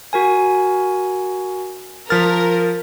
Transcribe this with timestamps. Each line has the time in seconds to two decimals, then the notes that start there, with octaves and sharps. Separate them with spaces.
0.13 F#4 A#4 G#5
2.10 F3 A#4 F6 A6 B6